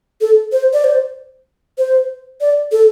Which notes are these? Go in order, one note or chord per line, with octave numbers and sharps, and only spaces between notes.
A4
C5
D5
C5
C5
D5
A4